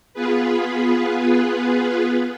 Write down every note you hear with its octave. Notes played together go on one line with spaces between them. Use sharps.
B3 F4 G#4 B4